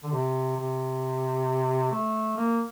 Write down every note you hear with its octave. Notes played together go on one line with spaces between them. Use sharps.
D3
C3
C3
A3
A#3